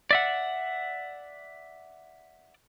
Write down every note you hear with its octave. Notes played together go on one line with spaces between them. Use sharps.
D5 E5 F#5